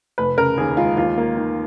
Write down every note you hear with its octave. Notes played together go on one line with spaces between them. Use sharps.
F1 B4
C#3 A#4
D#2 G#4
G#3 F4
D#2 F4
A#3
D#3